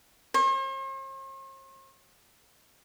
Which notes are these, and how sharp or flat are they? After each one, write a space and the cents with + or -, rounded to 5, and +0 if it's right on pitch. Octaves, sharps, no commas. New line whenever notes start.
C5 +45